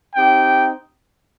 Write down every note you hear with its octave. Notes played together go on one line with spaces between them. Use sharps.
C4 D#4 G4 G5